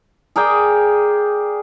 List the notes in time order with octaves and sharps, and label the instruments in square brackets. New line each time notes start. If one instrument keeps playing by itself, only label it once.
[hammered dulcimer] G#4 A#4 D5 G5